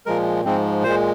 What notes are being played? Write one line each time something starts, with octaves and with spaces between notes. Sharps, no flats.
A#2 F3 G#3 A#4
G#2 F3 G#3 C4
A#2 G#3 C5